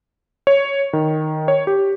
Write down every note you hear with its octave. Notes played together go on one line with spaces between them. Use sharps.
C#5
D#3
C#5
G4